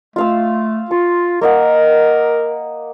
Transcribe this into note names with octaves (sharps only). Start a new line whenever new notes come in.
A3 F4 F5 E6
F4 C#6
A#3 A#4 D#5 F#5